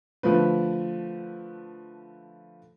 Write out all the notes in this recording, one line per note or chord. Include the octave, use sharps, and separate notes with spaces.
D3 F3 A3 B4